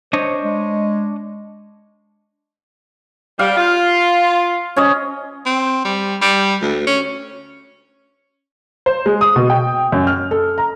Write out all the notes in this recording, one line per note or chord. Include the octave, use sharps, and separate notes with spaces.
D4 C5 C#5 D#5
G#3
G3 F5
F4
C#4 C#5 D#5
C4
G3
G3
D2
C#4
C5
G#3
D#6
B2
G5
F#2
F6
A4
A#5